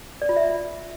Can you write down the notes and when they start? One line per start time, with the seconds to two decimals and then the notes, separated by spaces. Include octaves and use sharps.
0.22 D5
0.29 F4
0.36 E5